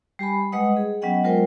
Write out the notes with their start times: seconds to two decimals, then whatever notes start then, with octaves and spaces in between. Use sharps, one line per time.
0.19 G3 G4 G#5 B5
0.52 G3 G#3 B4 D#5 F#5 D#6
0.77 G#4
1.02 F#3 B3 C#4 D#5 F#5 G5
1.23 F#3 G#3 F4 A#4 C5 G5